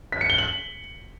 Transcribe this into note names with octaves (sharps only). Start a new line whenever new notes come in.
B6
C#7
G7
F#7